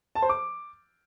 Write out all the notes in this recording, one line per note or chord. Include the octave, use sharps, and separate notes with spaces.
A5
C5
D6